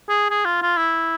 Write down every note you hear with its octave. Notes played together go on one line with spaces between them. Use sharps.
G#4
G#4
F4
F4
E4